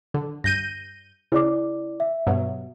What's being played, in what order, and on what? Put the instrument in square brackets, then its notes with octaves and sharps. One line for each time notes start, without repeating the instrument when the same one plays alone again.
[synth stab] D3
[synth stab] G2 G6 D#7 [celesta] A#6
[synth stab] C#3 [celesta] E4 D5 D6
[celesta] E5
[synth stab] G2 B2 F#3